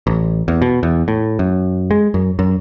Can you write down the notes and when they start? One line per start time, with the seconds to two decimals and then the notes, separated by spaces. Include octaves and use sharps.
0.07 A1
0.48 E2
0.62 B2
0.83 E2
1.08 A2
1.39 F#2
1.91 G#3
2.14 F#2
2.39 F#2